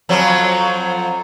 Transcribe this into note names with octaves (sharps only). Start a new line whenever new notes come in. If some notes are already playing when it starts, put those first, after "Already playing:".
F2 F3 F#3